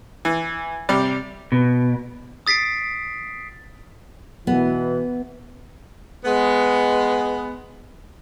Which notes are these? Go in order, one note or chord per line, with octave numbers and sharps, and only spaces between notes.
E3
C3 G3 D5
B2
D#6 A6 B6 C7 D7
B2 E3 B3
G#3 B3